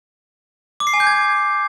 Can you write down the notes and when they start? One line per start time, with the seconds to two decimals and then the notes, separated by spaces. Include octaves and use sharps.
0.80 D6
0.87 C7
0.94 G#5
1.00 G6
1.07 G#6